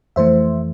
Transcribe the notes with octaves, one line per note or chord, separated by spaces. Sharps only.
F2 E3 A3 C5 E5